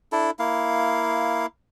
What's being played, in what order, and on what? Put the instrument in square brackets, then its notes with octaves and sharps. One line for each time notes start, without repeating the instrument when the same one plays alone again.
[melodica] D4 E4 A4
A#3 E4 F5